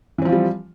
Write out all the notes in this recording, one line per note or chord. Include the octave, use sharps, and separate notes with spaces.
E3 F3 G3 C4 F4